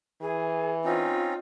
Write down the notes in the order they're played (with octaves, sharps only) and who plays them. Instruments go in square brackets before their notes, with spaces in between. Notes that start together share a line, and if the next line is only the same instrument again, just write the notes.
[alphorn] E3 [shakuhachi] G#4
[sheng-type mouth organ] C4 C#4 D#4 [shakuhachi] F4